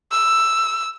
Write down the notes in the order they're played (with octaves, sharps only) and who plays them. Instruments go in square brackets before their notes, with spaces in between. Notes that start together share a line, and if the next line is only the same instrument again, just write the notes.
[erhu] E6